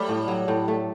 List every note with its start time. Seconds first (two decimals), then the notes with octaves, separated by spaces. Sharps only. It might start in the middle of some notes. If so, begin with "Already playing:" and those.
Already playing: F#3 G3 A3
0.09 A2
0.28 F#3
0.48 A2
0.68 A3